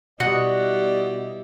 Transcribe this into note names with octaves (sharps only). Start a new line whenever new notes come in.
B2 G3 E4 F#4 D5 D#5 F#5